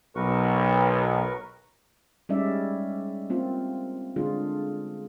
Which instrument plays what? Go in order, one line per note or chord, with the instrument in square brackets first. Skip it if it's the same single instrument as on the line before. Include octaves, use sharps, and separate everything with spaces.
[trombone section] B1 [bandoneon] A#4 B4 C#6
[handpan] G3 G#3 C#4 D#4 D5 E5
A#3 C4 F4
D3 G#3 D4 F4 G#4